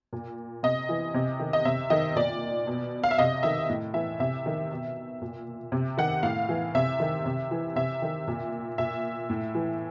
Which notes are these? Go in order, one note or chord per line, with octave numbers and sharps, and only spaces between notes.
A#2
C3 D#5
E3
C3
D#3
D#5
C3 E5
D#3 D#5
A#2 D5
B2
F5
E5
C3 D#5
D#3 E5
A2
E3 E5
C3 E5
D#3
B2
A#2
C3
D#3 F#5
A2 F5
E3
C3 E5
D#3
C3
E3
C3 E5
D#3
A#2
A#2 E5
A2
E3